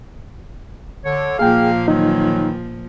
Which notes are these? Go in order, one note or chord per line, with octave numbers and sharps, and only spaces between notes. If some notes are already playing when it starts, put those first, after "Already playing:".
D3 C#5
A#2 F3 A#3 G#4 F5 G5
D#3 E3 F#3 D#4